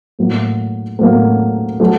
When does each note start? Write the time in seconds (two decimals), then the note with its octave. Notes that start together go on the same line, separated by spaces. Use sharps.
0.19 A2 F#3 A#3
0.99 A2 F#3 A#3
1.80 F#3 A3